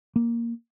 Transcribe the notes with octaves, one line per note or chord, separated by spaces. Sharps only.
A#3